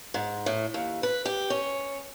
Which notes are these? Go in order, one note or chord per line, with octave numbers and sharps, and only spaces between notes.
G#2
A2
D#2
B4
G4
C#4